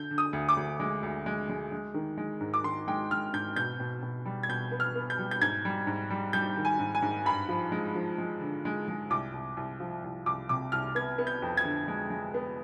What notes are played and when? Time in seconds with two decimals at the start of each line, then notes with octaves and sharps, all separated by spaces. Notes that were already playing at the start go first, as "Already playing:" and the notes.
Already playing: D3 G6
0.11 D3
0.18 D#6
0.33 D2
0.49 D6
0.57 D2
0.80 G#3
1.03 D2
1.26 G#3
1.50 G#3
1.72 G#3
1.94 D#3
2.18 G#3
2.41 G#2
2.54 D6
2.64 D#3 C6
2.88 G#3 G5
3.11 G#3 F6
3.33 G#2 G6
3.56 B2 G6
3.80 B2
4.03 B2
4.25 G3
4.43 G#6
4.49 B2 G6
4.72 B3
4.80 F6
4.95 B3
5.10 G6
5.19 G3
5.31 G6
5.42 G#2 G#6
5.65 G3
5.87 G#2
6.10 G3
6.33 G3 G6
6.57 D#3
6.65 G#5
6.80 G#2
6.95 G#5
7.02 G#2
7.26 G2 B5
7.49 F3
7.72 G#3
7.95 F3
8.18 G#3
8.41 D3
8.65 G#3
8.88 G#3
9.10 C2 D6
9.33 C2
9.57 C2
9.80 F3
10.04 C2
10.26 C2 D6
10.49 C3 D6
10.72 C2 F6
10.95 B3 G#6
11.18 B3
11.27 G6
11.42 F2
11.57 G#6
11.65 D3
11.88 G#3
12.10 G#3
12.34 B3